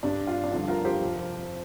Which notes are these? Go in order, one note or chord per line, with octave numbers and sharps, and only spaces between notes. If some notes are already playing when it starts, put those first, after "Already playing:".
G2 G3 D4
F4
D4
G2 D3 F3 F4
F4 A#4
G4 C5
F2 C3 F3